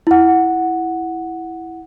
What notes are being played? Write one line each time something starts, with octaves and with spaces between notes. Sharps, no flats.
E4 F#5